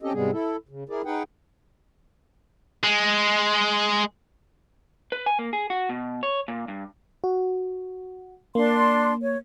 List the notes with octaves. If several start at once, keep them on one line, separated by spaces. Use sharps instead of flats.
C4 C#4 G4 A4 D#5
G#2 C3 G3 G#3 B3 G#4
E4 A4
C#3
E4 G#4 A#4 D5
D#4 G#4 B4 F#5 G5
G#3
B4
G#5
A#3
G#4
F#4
B2
C#5
A#2
G2
F#4
A#3 D4 C6
C#5